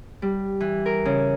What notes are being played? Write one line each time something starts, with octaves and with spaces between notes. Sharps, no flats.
G3
E3
A#4
C#3